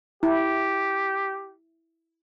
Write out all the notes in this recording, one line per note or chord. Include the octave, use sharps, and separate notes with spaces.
E4 G4